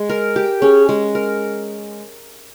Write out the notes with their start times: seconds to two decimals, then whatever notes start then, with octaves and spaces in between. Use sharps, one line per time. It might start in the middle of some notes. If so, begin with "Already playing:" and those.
Already playing: G#3
0.09 A#4
0.36 G4
0.61 C#4 G#4
0.89 G#3
1.15 A#4